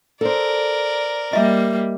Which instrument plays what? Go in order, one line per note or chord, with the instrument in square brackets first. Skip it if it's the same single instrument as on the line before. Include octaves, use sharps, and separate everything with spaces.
[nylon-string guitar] A4 C5 [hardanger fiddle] A#4 D5
[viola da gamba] G3 A#3 [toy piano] D#5 E5